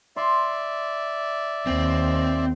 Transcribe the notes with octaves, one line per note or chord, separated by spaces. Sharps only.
D5 E5 C6
D#2 C4